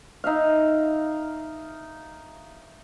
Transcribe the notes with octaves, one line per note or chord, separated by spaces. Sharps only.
D#4 E5 F5